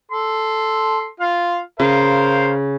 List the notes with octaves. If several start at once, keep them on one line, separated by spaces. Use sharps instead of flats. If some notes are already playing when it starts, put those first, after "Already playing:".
A4 C6
F4 F5
C#3 A#4 C5 F5